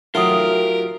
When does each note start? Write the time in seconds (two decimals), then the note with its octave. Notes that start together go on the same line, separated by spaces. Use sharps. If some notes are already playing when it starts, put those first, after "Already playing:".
0.15 F#3 A3 D#4 F4 G4 A#4 F#5 D#6